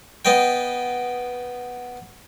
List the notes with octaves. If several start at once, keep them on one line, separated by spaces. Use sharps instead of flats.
B3 D#5 G5